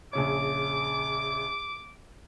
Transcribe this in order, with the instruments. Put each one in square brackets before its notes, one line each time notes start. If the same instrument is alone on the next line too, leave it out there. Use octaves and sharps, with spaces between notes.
[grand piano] A#1 C#3 C#5 [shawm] D6